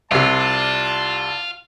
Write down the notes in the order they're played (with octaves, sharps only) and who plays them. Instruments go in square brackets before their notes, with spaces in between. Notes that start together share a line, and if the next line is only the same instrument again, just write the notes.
[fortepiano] C2 C3 [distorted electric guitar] F4 [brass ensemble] D5 A5